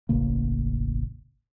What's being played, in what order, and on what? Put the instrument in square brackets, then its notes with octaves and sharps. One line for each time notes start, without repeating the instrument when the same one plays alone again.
[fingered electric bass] E1 A1 C#3 A#3